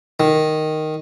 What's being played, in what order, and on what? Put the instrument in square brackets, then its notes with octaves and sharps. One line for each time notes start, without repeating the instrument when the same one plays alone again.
[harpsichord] D#3